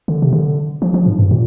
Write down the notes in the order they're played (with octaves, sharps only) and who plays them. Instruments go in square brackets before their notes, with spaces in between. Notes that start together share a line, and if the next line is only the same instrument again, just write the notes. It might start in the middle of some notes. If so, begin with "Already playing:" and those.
[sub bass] D3
C3
D3
F3
F3
G#2
G2
A#2